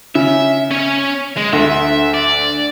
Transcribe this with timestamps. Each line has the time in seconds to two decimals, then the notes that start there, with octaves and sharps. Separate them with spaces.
0.15 C#3 E5
0.71 C#4 G#5
1.37 G#3
1.53 D2 E5
2.14 D5